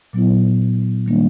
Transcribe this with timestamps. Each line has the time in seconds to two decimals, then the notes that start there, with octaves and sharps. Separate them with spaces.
0.13 A#2 F#3 B3 E4
1.06 D#3 G3 A#3 D4